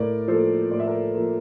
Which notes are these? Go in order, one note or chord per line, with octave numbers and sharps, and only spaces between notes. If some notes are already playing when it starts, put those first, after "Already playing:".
Already playing: A2 A#4 D5
F3 A#3 A4 C5
A2 D5
E5
A#4 D5
F3 A#3